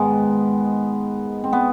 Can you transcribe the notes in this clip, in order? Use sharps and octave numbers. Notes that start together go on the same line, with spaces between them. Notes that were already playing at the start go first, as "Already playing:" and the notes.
Already playing: G#2 D#3 G#3 B3
C4
B3